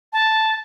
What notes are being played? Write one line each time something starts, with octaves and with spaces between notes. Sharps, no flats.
A5